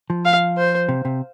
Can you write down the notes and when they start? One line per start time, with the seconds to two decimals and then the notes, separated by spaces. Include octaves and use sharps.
0.10 F3
0.25 F5
0.58 C5
0.89 C3
1.05 C3